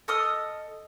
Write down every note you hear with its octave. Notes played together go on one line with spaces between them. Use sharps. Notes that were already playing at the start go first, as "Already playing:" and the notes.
A4 D#5 D#6 F6